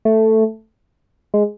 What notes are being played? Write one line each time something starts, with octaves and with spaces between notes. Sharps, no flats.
A3
G#3